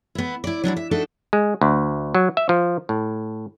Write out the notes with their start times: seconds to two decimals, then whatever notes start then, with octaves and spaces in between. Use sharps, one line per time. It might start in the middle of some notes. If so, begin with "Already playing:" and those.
0.15 B3 E4
0.44 E4 D5
0.64 F#3 D4 E4 F#4
0.76 E5
0.91 D4 D#4 F#4 A4 E5
1.33 G#3
1.61 D2
2.14 F#3
2.37 E5
2.49 F3
2.89 A2